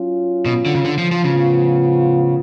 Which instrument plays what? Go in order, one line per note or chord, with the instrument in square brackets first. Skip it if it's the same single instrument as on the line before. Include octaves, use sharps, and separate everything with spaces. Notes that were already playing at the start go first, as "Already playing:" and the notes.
Already playing: [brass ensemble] F#3 C#4 F4
[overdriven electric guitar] B2
D3
C#3
D3
F3
F3
[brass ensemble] A2 F3 B3 F4 [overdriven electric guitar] C#3